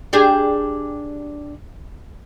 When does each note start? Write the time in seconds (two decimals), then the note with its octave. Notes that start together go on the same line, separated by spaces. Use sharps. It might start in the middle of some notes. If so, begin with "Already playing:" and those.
0.13 D4 G4 G#4